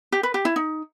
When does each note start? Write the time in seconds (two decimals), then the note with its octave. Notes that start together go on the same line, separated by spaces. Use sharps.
0.12 G4
0.23 B4
0.34 G4
0.45 E4
0.56 D#4